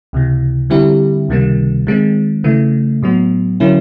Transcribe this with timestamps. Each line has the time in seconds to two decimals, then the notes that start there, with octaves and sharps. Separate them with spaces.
0.13 C#2 C3 E3
0.70 D3 G3 C4 E4 G4
1.29 C#2 C3 D#3 G3 A#3
1.87 D#3 G#3 C4
2.44 C#3 E3 A3
3.02 A2 F#3 B3
3.60 D3 F#3 A#3 C#4 E4